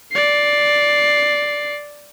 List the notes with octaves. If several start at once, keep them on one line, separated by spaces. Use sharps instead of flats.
D5 C7